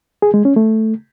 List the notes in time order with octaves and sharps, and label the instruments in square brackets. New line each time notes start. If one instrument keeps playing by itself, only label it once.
[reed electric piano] G#4
G#3
C#4
A3